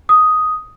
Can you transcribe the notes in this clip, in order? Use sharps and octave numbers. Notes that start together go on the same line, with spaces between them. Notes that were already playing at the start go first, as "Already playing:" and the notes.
D#6